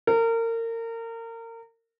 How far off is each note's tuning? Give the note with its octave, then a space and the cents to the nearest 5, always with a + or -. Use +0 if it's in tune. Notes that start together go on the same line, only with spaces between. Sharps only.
A#4 -30